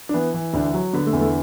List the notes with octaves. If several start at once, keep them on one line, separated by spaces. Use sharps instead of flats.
D4
E3 B3
E3
D2 D3 D4
F#3
D3 B3 B4
A3 A4
E2
A3 A4